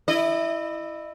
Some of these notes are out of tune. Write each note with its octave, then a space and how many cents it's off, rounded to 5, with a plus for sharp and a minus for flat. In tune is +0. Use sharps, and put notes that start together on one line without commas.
E4 +0 D#5 -35